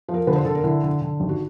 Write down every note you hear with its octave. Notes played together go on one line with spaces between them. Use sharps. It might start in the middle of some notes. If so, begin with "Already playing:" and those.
F3
A#4
D3 B4
C5
D3 A4
A#4
D3 E4
D3
D3
G#1
F#4